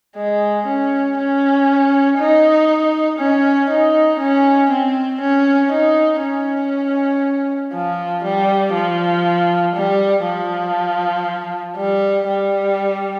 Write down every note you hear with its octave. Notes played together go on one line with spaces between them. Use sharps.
G#3
C#4
C#4
D#4
C#4
D#4
C#4
C4
C#4
D#4
C#4
F3
G3
F3
G3
F3
G3
G3